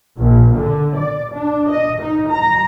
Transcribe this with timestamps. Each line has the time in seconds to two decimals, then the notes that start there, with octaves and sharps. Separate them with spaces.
0.17 A#1
0.55 D3
0.96 D5
1.34 D4
1.70 D#5
2.01 D#4
2.30 A#5